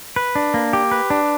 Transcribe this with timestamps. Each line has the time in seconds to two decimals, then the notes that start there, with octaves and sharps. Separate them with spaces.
0.16 B4
0.35 D4
0.54 A#3
0.73 G4
0.91 B4
1.10 D4